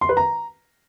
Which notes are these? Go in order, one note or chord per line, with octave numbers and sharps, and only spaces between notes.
C6
B4
A#5